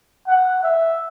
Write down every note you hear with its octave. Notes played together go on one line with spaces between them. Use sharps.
F#5
E5